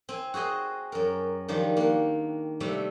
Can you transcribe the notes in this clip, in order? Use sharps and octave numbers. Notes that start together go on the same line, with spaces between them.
C4 G#5
F#4 G#4 C5 D#5
F#2 A#4
D#3 F3 G3 D4
A#3 F#5
C3 G3 A3 D4